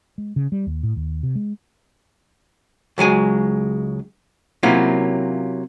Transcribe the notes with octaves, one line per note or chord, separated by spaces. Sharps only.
G#3
C#3
G3
D#2
A2
D#2
C3
G#3
C#2 F#3 G#3 G#5
C3 F#3 A#3 C#4 E4 F4